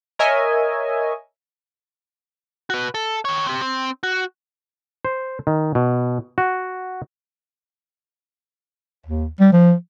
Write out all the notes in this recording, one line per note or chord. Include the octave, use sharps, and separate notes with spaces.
A#4 C#5 D#5 E5 G#5
F#4 B4
A4
D#3 C#5
C4 G4
C4
F#4
C5
D#3
B2
F#4
D#2
G3
F3